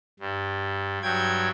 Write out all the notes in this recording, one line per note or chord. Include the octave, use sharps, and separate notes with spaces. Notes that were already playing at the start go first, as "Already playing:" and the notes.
G2
G2 F#3 G5 G#6